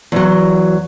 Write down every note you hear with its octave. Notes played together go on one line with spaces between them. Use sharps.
E2 F#3